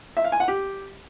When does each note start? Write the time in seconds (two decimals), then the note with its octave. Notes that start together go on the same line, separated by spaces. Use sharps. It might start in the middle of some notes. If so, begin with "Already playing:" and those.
0.17 E5
0.24 F5
0.32 G#5
0.40 F#5
0.48 G4